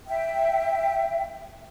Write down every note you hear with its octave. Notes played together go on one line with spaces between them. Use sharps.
E5 G5